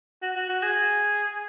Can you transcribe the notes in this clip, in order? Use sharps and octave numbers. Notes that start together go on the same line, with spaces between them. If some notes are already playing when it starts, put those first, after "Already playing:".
F#4
F#4
F#4
G#4